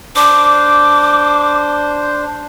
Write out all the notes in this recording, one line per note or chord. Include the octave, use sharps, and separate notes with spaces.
D4 C5 D6